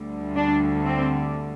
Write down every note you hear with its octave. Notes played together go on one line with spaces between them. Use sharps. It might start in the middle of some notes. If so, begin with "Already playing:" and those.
Already playing: D2 D3 G3
D4
C4